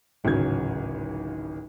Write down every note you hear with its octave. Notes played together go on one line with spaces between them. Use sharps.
D1 G#1 C#3 F#3 G6 G#6